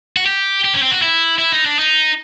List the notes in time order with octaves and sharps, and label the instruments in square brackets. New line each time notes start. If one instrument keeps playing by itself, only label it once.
[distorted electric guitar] F#4
G4
G4
C#4
C4
F#4
E4
E4
D#4
D4
D#4